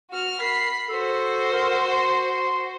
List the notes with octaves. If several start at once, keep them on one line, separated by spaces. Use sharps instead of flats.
F#4 F6
A#4 B5 C7
F#4 A4 C5
A#4
C6